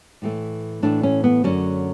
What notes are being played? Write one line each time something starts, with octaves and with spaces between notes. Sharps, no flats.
A2 E3 A3
A2 E3 A3 D4
C#4
B3
F#2 D3 F#3 A3 C#4